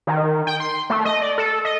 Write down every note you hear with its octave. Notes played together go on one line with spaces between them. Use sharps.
D#3
G5
C6
A3
D#5
D5
A4
D#5